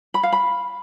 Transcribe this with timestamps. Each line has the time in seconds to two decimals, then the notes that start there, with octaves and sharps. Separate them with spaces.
0.14 B5
0.23 F5
0.32 B5